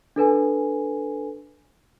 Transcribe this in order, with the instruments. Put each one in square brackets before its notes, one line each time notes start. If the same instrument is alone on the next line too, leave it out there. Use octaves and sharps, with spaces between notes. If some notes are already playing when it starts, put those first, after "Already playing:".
[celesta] D4 A4 B4 G#5